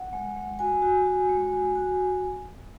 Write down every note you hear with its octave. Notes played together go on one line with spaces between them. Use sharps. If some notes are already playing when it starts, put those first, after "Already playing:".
Already playing: F#5
G#3
G#3
F#4 G#5
F#4
F#4
G#3
F#4
F#4